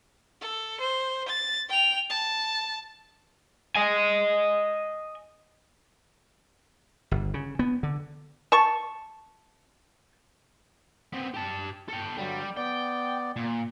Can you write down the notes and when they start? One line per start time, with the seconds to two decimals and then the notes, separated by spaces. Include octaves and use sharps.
0.41 A4
0.80 C5
1.28 A6
1.69 G5 F7
2.10 A5
3.76 D#5 G#5
7.11 G1
7.34 C#3
7.59 B3
7.83 D3
8.52 A5 C#6
11.13 B3 C4
11.34 G4 A5
11.89 A4 G5
12.18 G2 D3 F#3 G3
12.57 B3 D5 G5
13.36 A#2